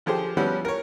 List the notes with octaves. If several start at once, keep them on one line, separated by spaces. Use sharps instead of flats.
D3 F3 G4 G#4 C5
F3 G3 B3 C#4 E4 F#4
A#4 C#5